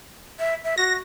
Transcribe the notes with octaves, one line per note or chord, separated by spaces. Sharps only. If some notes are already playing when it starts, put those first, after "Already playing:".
E5
E5
F#4 A#6